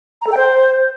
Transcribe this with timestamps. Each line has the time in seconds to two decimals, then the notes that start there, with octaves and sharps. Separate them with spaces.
0.22 A#5
0.27 A4
0.32 G5
0.37 C5